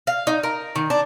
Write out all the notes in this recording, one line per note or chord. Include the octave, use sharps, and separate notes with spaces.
F5
D#4
A#4
D#3
D4